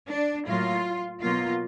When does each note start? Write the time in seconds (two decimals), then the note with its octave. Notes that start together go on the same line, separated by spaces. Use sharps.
0.09 D4
0.46 A2 F#3 A#3 F4
1.21 B2 F#3 A#3 F4